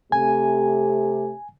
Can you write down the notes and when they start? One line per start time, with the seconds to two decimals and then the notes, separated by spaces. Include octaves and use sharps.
0.12 C3 A3 G4 G#5